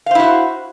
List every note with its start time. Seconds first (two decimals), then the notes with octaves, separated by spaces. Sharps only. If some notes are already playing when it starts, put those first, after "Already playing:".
0.06 F5
0.11 C5
0.15 E4
0.19 F#4